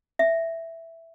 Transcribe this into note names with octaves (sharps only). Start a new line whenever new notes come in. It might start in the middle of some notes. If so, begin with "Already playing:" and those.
E5